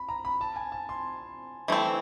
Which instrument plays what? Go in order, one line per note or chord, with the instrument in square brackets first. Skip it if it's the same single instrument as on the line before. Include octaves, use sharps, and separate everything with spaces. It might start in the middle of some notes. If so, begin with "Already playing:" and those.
Already playing: [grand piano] B5
A#5
B5
A5
G#5
A5
C6
[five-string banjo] E3 A3 C4